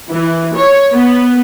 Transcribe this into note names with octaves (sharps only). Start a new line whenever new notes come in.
E3
C#5
B3